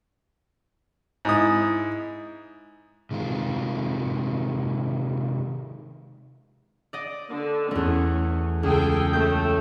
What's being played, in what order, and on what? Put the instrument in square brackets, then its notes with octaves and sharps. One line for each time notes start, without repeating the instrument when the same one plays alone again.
[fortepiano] G#2 E4 D#6
[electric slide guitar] C3 D#3 G#3 F4
[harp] D5 D#5
[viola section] D3
[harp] E2 A3 [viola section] C#4
[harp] C#2 [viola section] G#4 A4 G5
[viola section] A3 [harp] G6